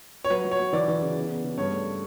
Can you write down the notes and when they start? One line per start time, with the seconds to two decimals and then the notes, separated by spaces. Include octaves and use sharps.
0.24 C#5
0.30 F#3 B4
0.45 F#3
0.51 C#5
0.60 F#3
0.73 E3 D5
0.88 E3
1.02 C#3
1.16 B3
1.30 B3
1.43 C#3
1.58 G2 C#5
1.72 A3